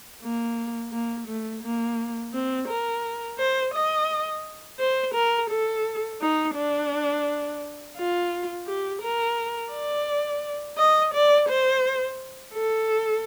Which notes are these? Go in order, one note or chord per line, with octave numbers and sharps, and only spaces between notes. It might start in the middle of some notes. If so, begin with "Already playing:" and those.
A#3
A#3
A3
A#3
C4
A#4
C5
D#5
C5
A#4
A4
D#4
D4
F4
G4
A#4
D5
D#5
D5
C5
A4